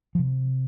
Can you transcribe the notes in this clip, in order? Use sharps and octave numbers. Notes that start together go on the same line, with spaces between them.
F3
C3